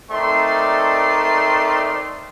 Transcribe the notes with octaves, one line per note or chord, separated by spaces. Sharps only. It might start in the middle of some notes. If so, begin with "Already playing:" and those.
A3 C4 D#4 A#4 D5 C6